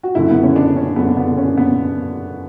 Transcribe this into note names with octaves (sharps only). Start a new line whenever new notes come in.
F#4
F#1 F#2 D3 E4
B3
C#4
D4
C#4
F#1 F#2 D3 B3
B3
C#4
B3